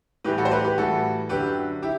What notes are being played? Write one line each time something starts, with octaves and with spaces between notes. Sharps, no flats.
A2 E3 G3 G4 B4
F#4 A4
C5
G4 B4
G4 B4
A2 E3 G3 F#4 A4
F#2 D3 F#3 G4 B4
E4 G4